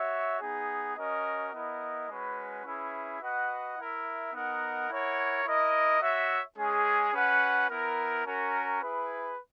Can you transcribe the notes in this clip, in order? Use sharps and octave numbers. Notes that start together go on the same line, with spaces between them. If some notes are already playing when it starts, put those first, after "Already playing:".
Already playing: F#4 C#5 E5
B3 D#4 G#4
C#4 F#4 A#4 D#5
B3 E4 A#4 D#5
G#3 C#4 F#4 B4
C#4 E4 G#4 B4 E5
F#4 B4 D#5 F#5
E4 A#4 E5
B3 D#4 A#4 D#5 F#5
E4 A#4 C#5 F#5
E4 A#4 D#5
F#4 C#5 E5
G#3 C#4 G#4
C#4 F#4 B4 F#5
B3 E4 A#4
C#4 F#4 A#4
E4 G#4 B4